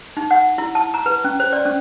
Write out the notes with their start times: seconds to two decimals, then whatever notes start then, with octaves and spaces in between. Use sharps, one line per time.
0.17 D#4
0.31 F#5
0.58 E4
0.75 A5
0.94 A#5
1.06 B4
1.24 C#4
1.40 C5
1.53 D5
1.65 C#4